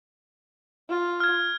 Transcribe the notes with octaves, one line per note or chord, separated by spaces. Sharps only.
F4
F6 G#6